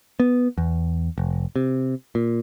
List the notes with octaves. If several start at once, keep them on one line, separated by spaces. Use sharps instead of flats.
B3
E2
F1
C3
A#2